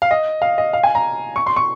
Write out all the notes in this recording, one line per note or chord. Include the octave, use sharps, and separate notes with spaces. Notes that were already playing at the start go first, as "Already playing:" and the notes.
F5
D#5
F5
D#5
F5
G#5
A#5
C#6
C6
C#6